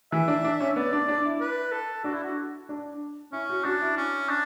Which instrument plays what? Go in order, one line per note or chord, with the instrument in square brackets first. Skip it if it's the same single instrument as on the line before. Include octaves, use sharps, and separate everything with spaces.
[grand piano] E3 [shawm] E5
[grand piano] D4
D4
C#4
[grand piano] B3 [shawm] D5
[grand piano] D4
D4
E4
[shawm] B4
A4
[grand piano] D4 [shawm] F#4
[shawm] E4
F#4
[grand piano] D4
[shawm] C#4 [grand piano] E4
[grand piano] F#4
[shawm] D4 [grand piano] F#4
[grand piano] E4
[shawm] C#4
D4